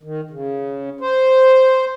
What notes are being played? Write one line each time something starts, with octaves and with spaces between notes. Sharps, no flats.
D#3
C#3
C5